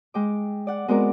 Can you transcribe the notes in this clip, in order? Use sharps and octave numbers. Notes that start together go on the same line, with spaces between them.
G#3 G5 D6
D5 F#5
G#3 B3 C4 F#4 A#4 D5